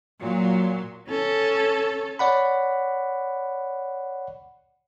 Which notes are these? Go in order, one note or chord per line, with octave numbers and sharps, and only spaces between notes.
A#2 F#3
C#4 A4
C#5 D5 F#5 B5